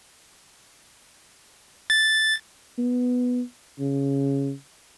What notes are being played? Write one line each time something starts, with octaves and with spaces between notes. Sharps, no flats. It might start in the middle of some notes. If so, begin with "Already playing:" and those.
A6
B3
C#3